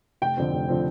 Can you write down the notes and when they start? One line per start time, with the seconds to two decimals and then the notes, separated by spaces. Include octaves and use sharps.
0.22 F1 G5
0.37 F2 D3 F3 C4
0.53 F1
0.68 D3 F3 C4